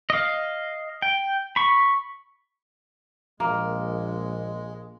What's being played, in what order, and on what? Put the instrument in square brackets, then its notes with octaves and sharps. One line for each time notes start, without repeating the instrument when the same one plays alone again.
[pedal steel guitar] D#5 F5
G5
B5 C#6
[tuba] A#1 [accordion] G#3 [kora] A#3